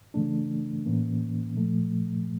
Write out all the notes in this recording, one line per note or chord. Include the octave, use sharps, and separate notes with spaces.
C#3 E3 A3 D4
A2 E3 A#3 C#4
A#2 F3 A3